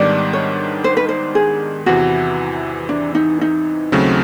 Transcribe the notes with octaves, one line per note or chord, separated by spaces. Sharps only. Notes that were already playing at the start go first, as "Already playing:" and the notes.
Already playing: G#2 D#3 G3 B3 D4 D5
C#5
C5
B4
C5
G#4
E2 C3 E3 F#4
D4
D#4
D#4
D#2 C#3 F#3 A3 C4